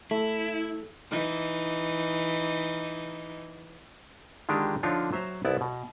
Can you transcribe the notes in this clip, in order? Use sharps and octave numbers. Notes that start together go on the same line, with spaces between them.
A3 E4
E3 D#4
D3 D#3 G#3 D4 F4 G4
D3 F3 D4 D#4 F4 C#5
F#3 C5 E5 A#5
C2 B3 E4 D5 A5
B2